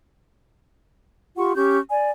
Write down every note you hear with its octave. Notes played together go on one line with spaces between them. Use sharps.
F4 G4 F#5 C#6
C#4 G4 C#6 G6
D5 G#5